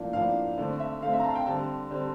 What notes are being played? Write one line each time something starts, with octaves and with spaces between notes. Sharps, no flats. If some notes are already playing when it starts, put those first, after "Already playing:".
Already playing: A2 F3 A#3 D4
A2 F3 A#3 D4 F5
D3 A3 C4 D5
E5
D3 A3 C4 F5
E5
A#5
A5
F5
G5
D3 G3 C4 A5
D3 G3 C4